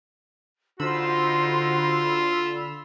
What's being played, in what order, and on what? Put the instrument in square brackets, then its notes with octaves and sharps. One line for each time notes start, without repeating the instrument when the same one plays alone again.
[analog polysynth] D3 B5 E6 [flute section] D#4 F#4 C5 [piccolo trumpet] F4